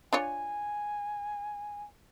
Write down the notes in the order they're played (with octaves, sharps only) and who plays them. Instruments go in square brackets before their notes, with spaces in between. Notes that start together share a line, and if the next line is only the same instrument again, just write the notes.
[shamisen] D4 F4 C#5 [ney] G#5